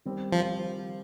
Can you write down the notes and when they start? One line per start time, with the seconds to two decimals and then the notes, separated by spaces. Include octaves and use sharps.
0.05 D#3 G3 C4
0.33 F3